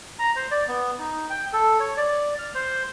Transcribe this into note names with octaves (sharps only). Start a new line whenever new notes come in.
A#5
C5
D5
B3
D#4
G5
A4
C#5
D5
F6
C5